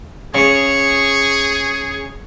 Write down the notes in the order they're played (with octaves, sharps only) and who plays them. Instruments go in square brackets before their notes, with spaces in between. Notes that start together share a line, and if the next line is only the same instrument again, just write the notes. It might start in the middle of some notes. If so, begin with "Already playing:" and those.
[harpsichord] C#3 C#5 [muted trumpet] G#4 [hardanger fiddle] C#6